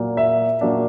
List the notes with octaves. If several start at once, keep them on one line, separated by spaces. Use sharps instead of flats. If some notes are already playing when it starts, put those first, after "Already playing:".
Already playing: A#2 F#3 A#3
E5
A#2 F#3 A#3 D4